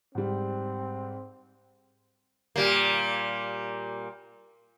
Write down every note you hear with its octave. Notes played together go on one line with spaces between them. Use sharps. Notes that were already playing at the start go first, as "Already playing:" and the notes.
G#2 G3 C4
A#2 G3 A#3